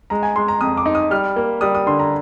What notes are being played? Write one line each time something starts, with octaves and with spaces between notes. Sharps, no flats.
G#3 A#5
G#5
G#3 C6
A#5
F2 D#6
D6
D#4
D#6
G3 F6
A#3
G3 D#6
D#6
D3 C6
A#5